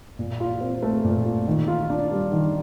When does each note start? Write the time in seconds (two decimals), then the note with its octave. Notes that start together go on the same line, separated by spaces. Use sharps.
0.19 A#2
0.40 F4
0.61 C4
0.82 A3
1.04 A#2
1.25 F4
1.47 D#3
1.68 F4
1.90 D4
2.11 G3
2.32 D#3